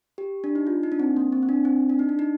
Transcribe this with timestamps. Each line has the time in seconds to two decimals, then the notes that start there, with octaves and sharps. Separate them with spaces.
0.18 G4
0.44 D4
0.55 D#4
0.67 F4
0.83 D#4
0.92 D4
1.00 C4
1.17 A#3
1.32 C4
1.43 C4
1.49 D4
1.65 C4
1.89 D4
1.99 D#4
2.09 D4
2.19 D#4